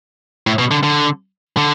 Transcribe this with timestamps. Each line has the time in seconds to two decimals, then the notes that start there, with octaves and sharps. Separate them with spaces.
0.47 A2
0.59 B2
0.71 D3
0.84 D3
1.57 D3